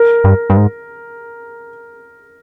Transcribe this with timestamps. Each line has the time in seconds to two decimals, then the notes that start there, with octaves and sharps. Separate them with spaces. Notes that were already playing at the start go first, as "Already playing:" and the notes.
Already playing: A#4
0.24 G2
0.50 G2
0.57 G#2